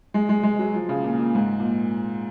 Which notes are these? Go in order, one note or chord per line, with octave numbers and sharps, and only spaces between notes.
G#3
G#3
G#3
F#3
F3
C#3
A#2
A#2
G#2
A#2